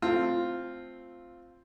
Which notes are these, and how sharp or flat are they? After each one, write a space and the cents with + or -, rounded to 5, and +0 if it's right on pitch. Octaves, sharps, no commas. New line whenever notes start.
A3 +0 C4 +0 F4 +0